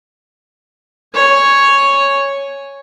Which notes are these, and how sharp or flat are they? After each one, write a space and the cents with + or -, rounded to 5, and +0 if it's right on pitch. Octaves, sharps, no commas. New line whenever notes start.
C#5 +0 G#5 +0